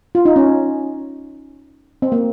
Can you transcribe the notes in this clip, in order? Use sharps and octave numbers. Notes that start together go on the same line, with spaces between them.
F4
D#4
C#4
C4
A#3